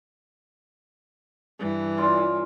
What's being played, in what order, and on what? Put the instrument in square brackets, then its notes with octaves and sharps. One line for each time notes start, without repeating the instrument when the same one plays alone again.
[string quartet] G2 E3
[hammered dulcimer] C#3 F4 D5